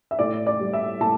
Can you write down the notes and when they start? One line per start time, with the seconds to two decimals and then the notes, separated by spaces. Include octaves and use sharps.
0.11 E5
0.19 A2 D5
0.47 D5
0.60 G3
0.73 E5
1.00 A2 A5